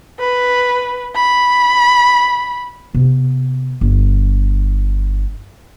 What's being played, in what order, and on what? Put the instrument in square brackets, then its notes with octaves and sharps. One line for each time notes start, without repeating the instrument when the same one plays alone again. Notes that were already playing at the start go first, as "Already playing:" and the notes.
[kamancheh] B4
B5
[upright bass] C3 B3
G1